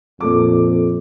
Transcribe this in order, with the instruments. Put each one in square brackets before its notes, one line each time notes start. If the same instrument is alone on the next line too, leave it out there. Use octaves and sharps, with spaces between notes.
[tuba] F2 [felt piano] A#2 A4 D6